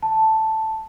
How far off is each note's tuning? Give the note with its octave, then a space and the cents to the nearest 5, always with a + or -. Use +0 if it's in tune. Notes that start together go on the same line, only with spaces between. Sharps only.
A5 +0